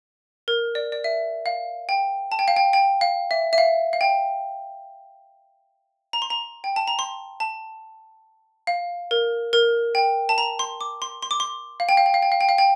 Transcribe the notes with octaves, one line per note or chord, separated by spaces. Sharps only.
A#4
D5
D5
E5
F5
G5
A5
G5
F5
G5
G5
F5
E5
E5
F5
F5
G5
A#5
C6
A#5
G5
A5
A#5
C6
A5
F5
A#4
A#4
G5
A5
A#5
C6
D6
C6
C6
D6
C6
F5
G5
F5
G5
F5
G5
F5
G5
F5
G5